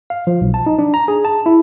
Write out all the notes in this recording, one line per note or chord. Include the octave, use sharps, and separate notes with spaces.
F5
F3
B1
A5
D#4
D4
A#5
G#4
A5
E4